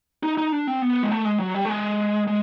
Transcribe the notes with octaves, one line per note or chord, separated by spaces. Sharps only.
D#4
D#4
D4
C4
B3
G#3
A3
G#3
F#3
G3
A3
G#3
G#3